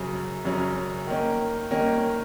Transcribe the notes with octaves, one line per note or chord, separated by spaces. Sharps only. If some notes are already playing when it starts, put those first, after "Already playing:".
Already playing: F#2 C#3 F#3 C#4
F#2 C#3 F#3 C#4
D#3 A#3 C#4
D#3 A#3 C#4